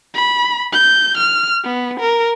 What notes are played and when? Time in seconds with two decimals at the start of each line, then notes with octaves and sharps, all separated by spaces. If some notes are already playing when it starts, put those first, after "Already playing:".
0.14 B5
0.73 G6
1.18 F6
1.64 B3
2.00 A#4